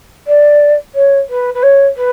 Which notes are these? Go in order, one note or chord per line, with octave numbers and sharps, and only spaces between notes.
D5
C#5
B4
B4
C#5
B4